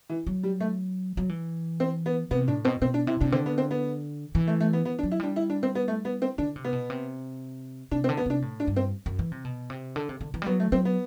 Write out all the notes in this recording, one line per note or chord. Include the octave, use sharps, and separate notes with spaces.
E3
F#3
G3
A3
F#3
E3
C4
B3
C3 B3
A2 D4
B2 C4
B2 C4
D4
C3 E4
C3 D4
D3 C4
B3
C4
B3
E3
A3
A3
B3
B3
D4
F#3
E4
G3 D4
E4
D4
C4
B3
A3
B3
C4
D3 D4
C3
B3
B2
C3
C3 D4
C4
D3
B3
C3 D4
A2
D4
G2
C4
F#2
E3
C3
B2
C3
D3
C3
D3
E3
G3
F#3 B3
A3
F#3 C4
B3